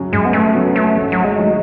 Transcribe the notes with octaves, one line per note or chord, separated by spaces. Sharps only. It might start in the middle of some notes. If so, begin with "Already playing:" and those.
Already playing: F#2 C#3 F#3 C#4
F#2 G#3
B3
A3
C#3 F#3 B3 C#4
A3
G#1
F#3
G#3
F#3 A3 D#4